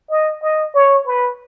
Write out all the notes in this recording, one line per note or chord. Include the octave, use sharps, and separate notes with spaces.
D#5
D#5
C#5
B4